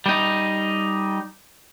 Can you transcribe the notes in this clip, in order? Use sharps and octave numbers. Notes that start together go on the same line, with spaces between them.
G3 D#4